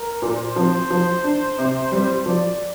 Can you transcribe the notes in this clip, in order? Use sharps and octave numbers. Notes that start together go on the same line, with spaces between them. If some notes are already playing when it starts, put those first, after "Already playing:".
Already playing: A#4
A#2 C5
F3 C4
F3
D4
C3
G3 C4
F3 D5